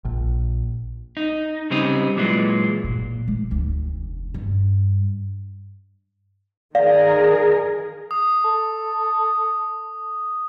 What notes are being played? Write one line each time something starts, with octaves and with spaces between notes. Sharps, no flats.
A#1
D#4
C#3 G3 C4 D#4
A#2 E3 F#3 G#3
A#2
A1
F1 D2
G2
D#3 G#4 A#4 D5 F5
D#6
A4